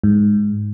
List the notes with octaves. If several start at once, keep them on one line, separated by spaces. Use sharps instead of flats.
G#2